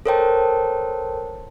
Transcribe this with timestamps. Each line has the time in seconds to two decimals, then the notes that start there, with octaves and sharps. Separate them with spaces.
0.06 A4 A#4 C5 C#5 G5 A5